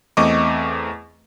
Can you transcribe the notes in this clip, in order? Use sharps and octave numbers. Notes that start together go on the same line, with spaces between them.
E2 A3 C4 D#5 C#6 D6